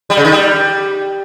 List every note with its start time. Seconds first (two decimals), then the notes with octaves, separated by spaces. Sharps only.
0.10 G3
0.17 C#3
0.25 D#3
0.32 G3